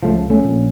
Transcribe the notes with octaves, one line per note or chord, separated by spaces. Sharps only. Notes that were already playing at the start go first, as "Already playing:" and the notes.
C#2 C#3 F3 A3
A3 C#4
A#1 A#2